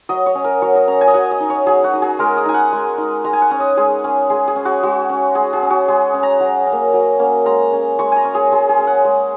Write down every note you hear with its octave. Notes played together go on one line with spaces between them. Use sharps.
F#3 D#5
C#5
C#4
A#4
F#3 C#5
D#5
C#4 A#5
G#5
D#5
F#3 F#5
D#5
D#4
C#5
F#3 G#4
F#4
D#4
G#4
G#3 A#4
D#5
D#4 G#5
F#5
G#3
D#4
G#3 A#5
G#5
F#5
C#4
D#5
G#3 G#4
C#4
G#3 G#4
G#4
C#4
F#4
G#3 F#4
C#4
G#3 G#4
G#4
C#4
F#4
G#3 G#4
C#4
A#5
F#3
C#4
A#3
F#3
A#3 C#4
G#3 A#5
C#4
G#3 C#6
G#5 A#5
C#4
G#4
G#3 G#4
G#4
C#4
F#5
G#3